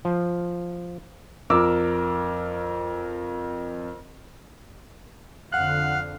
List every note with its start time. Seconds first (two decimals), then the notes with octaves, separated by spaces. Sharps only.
0.05 F3
1.50 F2 A#4 D6 E6
5.52 F2 D3 F5 F#5 F#6